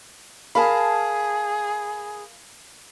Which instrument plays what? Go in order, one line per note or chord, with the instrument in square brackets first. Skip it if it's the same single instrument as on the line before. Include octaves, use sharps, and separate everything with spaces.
[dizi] G#4 [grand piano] A#4 B5 [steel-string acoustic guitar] F5 A5